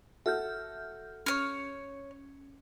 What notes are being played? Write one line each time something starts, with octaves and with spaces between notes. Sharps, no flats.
F#4 A4 E5 F6 G6
C#4 C#5 F6